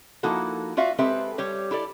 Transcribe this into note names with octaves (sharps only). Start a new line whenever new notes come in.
F3 A#3 D#4 E4 F#4 A4
F4 F#4 D5 E5 F5
G#3 C4 G4 A4 B4 E5
G3 G4 C#5
E4 G4 A4 D5